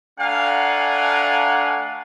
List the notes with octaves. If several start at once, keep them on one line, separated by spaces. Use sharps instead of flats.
A3 D4 F5 F#5 G#5 A#5